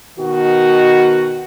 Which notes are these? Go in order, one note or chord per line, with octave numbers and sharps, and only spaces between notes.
B2 D#3 F#4